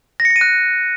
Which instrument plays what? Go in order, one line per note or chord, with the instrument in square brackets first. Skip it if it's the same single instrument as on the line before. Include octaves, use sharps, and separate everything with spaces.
[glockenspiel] A#6
C#7
A#6
D#7
F#6